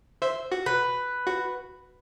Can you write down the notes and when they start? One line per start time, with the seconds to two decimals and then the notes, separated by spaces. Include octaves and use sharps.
0.22 C5 E5
0.52 F#4
0.66 B4
1.27 F#4